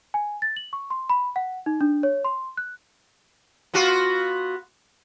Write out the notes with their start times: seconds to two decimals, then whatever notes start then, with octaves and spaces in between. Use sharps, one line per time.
0.14 G#5
0.42 A6
0.56 F#7
0.73 C#6
0.90 C6
1.10 B5
1.36 F#5
1.66 D#4
1.81 D4
2.03 C#5
2.24 C6
2.57 F#6
3.74 B3 F4 F#4